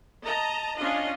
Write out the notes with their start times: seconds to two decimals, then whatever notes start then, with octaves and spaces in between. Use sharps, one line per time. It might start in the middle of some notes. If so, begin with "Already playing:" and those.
0.24 D#5 A5 A#5
0.77 C#4 D4 F4 D#5